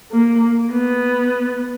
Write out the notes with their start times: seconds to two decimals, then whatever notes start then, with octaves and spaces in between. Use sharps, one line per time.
0.12 A#3
0.72 B3